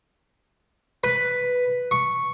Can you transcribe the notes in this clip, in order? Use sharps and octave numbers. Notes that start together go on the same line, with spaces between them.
B4
C#6